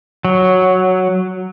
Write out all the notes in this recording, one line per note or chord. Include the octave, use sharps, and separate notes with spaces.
F#3